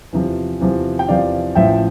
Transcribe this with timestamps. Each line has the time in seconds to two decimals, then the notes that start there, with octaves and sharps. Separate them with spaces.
0.13 E2 C3 F3
0.61 E2 C3 F3
0.99 G5
1.08 E2 C3 F3 D5 F5
1.55 A1 A2 F3 E5 G5